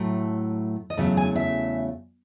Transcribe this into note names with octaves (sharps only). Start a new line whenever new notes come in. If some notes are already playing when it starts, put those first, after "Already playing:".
Already playing: A2 F#3 A3
D#5
E2 C#3 F#3 A3 E5
G#5
E5